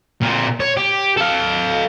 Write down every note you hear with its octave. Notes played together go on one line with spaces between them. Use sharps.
A#2 C4
C#5
G4
A4 F5